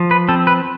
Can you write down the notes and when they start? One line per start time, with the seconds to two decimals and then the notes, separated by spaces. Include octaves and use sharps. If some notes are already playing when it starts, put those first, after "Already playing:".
Already playing: F3
0.11 B4
0.29 C4 A4
0.47 B4